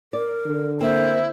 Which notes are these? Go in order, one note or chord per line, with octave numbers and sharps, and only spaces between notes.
A#4 D5
D3
A#3 C4 E4 C5